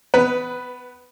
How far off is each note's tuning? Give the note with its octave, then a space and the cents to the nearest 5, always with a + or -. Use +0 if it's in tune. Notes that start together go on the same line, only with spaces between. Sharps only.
B3 +20 B4 +0